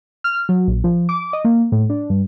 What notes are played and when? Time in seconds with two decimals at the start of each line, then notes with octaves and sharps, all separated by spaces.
0.24 F6
0.49 F#3
0.68 A#1
0.84 F3
1.09 D6
1.33 D#5
1.45 A#3
1.72 A2
1.90 D4
2.10 G2